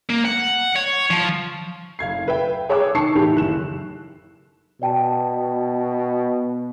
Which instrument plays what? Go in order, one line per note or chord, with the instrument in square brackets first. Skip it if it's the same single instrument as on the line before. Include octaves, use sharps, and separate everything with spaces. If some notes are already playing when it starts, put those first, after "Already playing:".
[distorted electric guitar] A#3
F#5
C#5
F3
[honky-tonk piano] F#1 F5 G#6 C7
B4 E5 G5
G#4 C#5 G5 D6 E6 F#6
D#3 A5 C#6 E6 C7 C#7
A2 D#3 E3 G4
F#1 F#6 E7
[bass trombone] B2 [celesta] D5 G5 A5